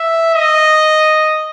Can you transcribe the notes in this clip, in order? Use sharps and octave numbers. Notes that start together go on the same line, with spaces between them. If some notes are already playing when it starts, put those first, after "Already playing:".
Already playing: E5
D#5